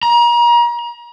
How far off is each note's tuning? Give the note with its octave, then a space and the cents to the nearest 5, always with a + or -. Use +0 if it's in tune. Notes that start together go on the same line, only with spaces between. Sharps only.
A#5 +35